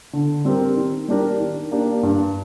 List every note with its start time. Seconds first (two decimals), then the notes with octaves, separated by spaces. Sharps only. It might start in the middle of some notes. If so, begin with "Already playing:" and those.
0.13 D3
0.45 G3 C4 G4 A#4
0.77 D#3
1.08 G3 D4 G4 A#4
1.40 D#3
1.71 A#3 D4 G4
2.03 G2